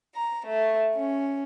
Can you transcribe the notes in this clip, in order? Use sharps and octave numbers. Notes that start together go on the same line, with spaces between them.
A#5
A3
C#4